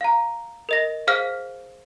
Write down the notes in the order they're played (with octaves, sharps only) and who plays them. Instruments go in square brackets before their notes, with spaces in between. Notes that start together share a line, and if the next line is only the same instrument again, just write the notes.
[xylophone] F5 A#5
A#4 D#5 A#6
G#4 C5 F5 F6 B6